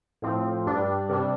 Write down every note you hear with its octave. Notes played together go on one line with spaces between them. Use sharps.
A2 F3 C4
G2 G3 D4
C3 G3 D4